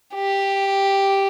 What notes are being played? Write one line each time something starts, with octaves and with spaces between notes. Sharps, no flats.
G4